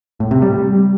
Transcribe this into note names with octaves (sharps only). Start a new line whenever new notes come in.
A2
C3
G3